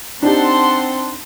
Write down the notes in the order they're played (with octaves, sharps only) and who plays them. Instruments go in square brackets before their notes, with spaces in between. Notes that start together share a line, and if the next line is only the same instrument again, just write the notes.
[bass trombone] C4 [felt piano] D4 D#4 G4 [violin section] F#5 A5 C6